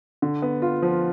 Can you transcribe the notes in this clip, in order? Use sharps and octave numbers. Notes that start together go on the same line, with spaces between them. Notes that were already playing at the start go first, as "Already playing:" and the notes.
D3
B3
F4
F3